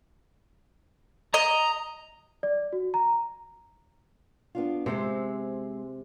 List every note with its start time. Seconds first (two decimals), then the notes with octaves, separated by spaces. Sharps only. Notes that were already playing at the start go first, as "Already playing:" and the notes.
1.34 D#5 A#5
2.43 D5
2.73 F#4
2.94 A#5
4.55 B3 D4 F4
4.86 C3 G#3 C4 C5